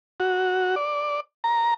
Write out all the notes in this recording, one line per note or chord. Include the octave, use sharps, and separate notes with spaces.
F#4
D5
A#5